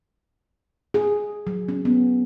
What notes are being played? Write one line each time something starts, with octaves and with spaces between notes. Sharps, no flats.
G#4
F#3
C#4
B3